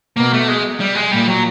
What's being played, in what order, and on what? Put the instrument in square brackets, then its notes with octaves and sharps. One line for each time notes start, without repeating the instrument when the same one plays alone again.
[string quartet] B2 [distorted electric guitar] A#3
[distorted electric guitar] A3
G#3
G3
G#3
[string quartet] A#2 [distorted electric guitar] G3
[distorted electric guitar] F#3